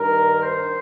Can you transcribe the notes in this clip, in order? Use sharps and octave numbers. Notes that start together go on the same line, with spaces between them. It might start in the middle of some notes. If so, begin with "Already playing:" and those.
Already playing: G2 D#3 A#4
C5